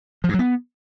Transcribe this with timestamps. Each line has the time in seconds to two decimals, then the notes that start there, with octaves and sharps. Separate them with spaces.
0.24 F3
0.29 G2
0.34 F#3
0.39 B3